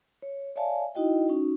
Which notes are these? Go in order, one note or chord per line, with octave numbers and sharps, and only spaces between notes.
C#5
C#5 D5 E5 F5 G#5 A5
D#4 E4 F#4 D#5 G5
C#4 D#4 F#4